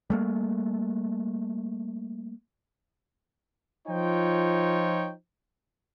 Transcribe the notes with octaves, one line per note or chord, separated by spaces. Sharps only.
G3 A3 A#3
F3 D#4 F4 C5 C#5 G5